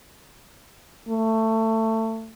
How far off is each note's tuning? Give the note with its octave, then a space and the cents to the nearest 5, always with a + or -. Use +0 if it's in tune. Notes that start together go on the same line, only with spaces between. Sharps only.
A3 +20